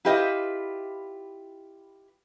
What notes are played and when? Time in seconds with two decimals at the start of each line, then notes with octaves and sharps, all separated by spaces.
0.05 E4 F4 G4 B4 D#5